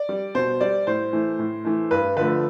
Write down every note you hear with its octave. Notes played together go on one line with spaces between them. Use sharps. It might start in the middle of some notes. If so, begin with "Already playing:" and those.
Already playing: D5
G3
B2 C5
G3 D5
A2 C5
E3 A3
A2
E3 A3
G2 B4
D3 F3 A3 B4